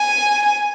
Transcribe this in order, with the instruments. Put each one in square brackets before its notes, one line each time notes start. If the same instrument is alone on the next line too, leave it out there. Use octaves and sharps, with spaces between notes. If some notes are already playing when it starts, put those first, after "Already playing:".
Already playing: [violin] G#5